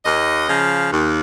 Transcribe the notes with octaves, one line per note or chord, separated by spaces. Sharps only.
D#2 D#5
C#3 F3
D#2